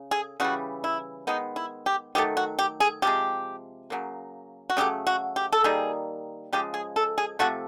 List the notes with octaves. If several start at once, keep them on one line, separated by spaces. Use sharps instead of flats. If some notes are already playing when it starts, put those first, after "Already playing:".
Already playing: C#3
G#4
C#3 E3 G3 F#4
E4
D#3 G#3 B3 D#4
E4
G4
D#3 F#3 A3 G4
F#4
G4
G#4
C3 F3 G#3 G4
C#3 F#3 A#3
F#4
C#3 F#3 A3 G4
F#4
G4
A4
D#3 G3 A#3 G#4
C#3 F3 G#3 G4
G#4
A4
G#4
C3 F3 A3 F#4